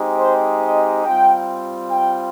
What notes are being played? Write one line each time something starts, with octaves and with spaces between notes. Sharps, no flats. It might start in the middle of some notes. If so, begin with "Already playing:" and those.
Already playing: G#3 C4 D#4 G4
C5
D#5
G3 C4 F4 G5
G5